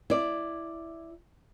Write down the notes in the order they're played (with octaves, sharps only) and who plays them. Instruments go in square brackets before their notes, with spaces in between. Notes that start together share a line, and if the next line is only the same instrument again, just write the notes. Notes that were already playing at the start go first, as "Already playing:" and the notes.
[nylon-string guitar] E4 D5